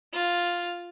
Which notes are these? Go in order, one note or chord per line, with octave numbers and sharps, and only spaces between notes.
F4